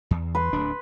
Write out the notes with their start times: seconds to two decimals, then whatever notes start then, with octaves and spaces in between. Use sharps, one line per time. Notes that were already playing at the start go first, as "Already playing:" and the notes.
0.11 E2
0.35 B4 C6
0.53 D1 D4